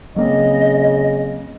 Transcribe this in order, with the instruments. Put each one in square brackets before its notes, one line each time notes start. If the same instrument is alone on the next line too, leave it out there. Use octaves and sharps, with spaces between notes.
[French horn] C#3 [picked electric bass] F#3 A#3 C4 [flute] D#5